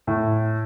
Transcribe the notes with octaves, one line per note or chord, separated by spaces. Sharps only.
A2